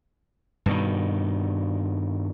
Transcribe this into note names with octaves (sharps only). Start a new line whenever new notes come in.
G2 B2 D#3